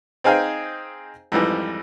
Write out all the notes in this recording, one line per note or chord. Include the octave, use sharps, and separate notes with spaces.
C4 D#4 G#4 F5 G5 G#5
F2 G#2 E3 G3